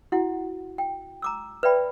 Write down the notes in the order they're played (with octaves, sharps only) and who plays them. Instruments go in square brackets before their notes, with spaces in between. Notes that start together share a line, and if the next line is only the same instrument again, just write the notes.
[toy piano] E4 F#4 F#5
G5
A#5 D6 E6
B4 D5 E5 G5 B5